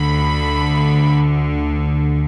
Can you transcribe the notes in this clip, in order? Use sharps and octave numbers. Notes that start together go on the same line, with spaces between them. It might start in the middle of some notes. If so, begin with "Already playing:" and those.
Already playing: D2 D3 B5